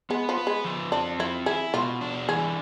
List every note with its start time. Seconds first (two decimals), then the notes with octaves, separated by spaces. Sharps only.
0.10 G#3 B3
0.29 F3
0.38 B4
0.47 G#3
0.65 F3
0.92 C4 D4
1.19 F3 E4
1.46 E4 G#4
1.74 B2 F4
2.01 D4
2.29 E3 G#4